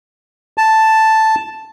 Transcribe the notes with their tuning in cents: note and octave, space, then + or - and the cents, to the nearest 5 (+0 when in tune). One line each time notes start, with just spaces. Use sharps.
A5 +0